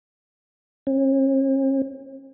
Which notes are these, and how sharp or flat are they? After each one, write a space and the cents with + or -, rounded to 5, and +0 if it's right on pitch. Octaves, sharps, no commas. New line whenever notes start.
C#4 -45